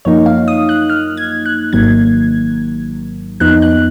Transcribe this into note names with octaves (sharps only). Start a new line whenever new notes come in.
F#2 F3 A#3 D#4 C#5
F5
D#6
F#6
F6
G#6
F#6
G#1 G#2 D#3 F#3 A#3 G#6
F2 F3 B3 D#4 F#6
F#6